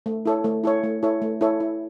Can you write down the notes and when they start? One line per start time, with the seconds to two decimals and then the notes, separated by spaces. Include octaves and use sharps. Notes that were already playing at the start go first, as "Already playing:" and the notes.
0.06 A3
0.26 E4 A4 C#5
0.44 A3
0.64 E4 A4 C#5
0.84 A3
1.03 E4 A4 C#5
1.22 A3
1.41 E4 A4 C#5
1.60 E4